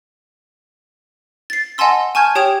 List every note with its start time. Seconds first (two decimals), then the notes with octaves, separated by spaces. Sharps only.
1.50 A6 C7
1.78 D#5 F#5 G#5 A5 C6 E6
2.15 G#5 A5 C#6 F6 G6 G#6
2.35 G4 C#5 G5 D#6 G#6 F7